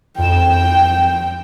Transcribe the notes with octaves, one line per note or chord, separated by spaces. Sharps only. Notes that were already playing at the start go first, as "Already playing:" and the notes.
F2 G5 E7